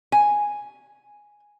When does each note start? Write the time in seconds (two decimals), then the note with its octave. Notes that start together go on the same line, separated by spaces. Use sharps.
0.12 G#5